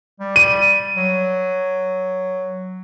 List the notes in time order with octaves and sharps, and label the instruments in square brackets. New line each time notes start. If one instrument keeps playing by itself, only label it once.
[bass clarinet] G3
[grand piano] D#7
[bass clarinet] F#3